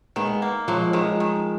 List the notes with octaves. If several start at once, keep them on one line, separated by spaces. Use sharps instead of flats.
D#3 G#3 B3
A#3
F3 F#3 G#3
D#3 F3 G#3
D#3